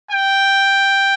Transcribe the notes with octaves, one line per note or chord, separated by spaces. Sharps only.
G5